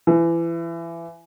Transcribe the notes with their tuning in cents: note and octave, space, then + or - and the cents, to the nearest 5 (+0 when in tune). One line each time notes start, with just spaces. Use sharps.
E3 +25